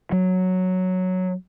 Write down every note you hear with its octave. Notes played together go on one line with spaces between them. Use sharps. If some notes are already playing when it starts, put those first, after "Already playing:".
F#3